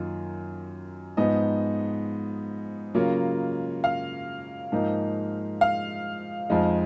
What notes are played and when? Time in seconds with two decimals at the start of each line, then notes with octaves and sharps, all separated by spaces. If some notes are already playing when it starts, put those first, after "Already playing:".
Already playing: F#2 D#3 A#3 F4
1.17 G#2 F3 B3 D#4 D#5
2.95 C#3 F#3 A#3 C#4 F4
3.84 F5
4.72 G#2 F3 A#3 D#4
5.61 F5
6.49 F2 F3 G#3 D#4